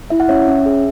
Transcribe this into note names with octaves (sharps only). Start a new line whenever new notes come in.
E4 E5
F#5
C#4 C#5 E5
C#4
G#4